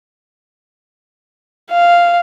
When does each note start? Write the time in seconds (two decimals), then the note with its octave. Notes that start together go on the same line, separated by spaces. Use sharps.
1.71 F5